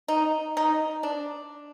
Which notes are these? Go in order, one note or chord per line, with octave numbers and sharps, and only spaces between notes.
D#4
D#4
D4